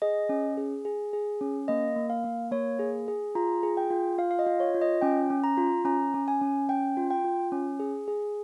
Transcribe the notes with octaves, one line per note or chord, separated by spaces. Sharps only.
G#4 D#5
C#4
G#4
G#4
G#4
C#4
A#3 D#5
A#3
F5
A#3
A#3 C#5
G#4
G#4
F4 A#5
G#4
G5
F4
F4 F5
F5
D#5
F4
C#5
F4
D#5
C#4 G5
C#4
A#5
F4
C#4 A#5
C#4
G#5
C#4
C#4 G5
F4
G5
F4
C#4
G#4
G#4